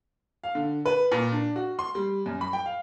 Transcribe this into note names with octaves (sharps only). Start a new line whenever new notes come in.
F5
D3
B4
A#2
D4
F#4
C6
G3
F#2
B5
G5
F5